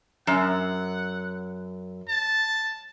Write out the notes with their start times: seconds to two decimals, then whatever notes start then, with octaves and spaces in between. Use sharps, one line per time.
0.27 F#2 F#5
2.08 A5